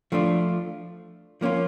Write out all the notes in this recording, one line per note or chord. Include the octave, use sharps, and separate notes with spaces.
F3 A3 D4 F4
F3 A#3 C#4 F4